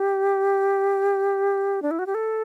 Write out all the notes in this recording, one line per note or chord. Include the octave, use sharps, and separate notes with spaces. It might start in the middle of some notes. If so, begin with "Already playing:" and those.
Already playing: G4
D4
E4
F#4
G4
A4